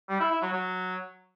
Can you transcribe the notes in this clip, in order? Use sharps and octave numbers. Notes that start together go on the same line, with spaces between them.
G3
E4
E4
F#3
F#3